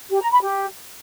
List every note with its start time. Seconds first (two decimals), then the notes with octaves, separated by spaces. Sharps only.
0.10 G4
0.21 A#5
0.32 B5
0.43 G4